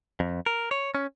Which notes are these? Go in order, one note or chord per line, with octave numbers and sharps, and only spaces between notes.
F2
A#4
C#5
C#4